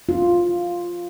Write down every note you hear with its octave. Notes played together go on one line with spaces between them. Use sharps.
F4